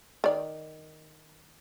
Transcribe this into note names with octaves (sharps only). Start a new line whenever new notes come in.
D#3 D5